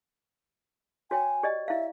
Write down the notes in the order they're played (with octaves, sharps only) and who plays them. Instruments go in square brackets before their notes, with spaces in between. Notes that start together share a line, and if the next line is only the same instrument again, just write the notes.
[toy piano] F#4 C#5 G5 [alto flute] G#5
[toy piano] G4 D5 D#5
[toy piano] E4 F5 [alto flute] E5